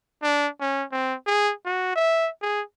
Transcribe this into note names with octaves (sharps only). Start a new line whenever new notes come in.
D4
C#4
C4
G#4
F#4
E5
G#4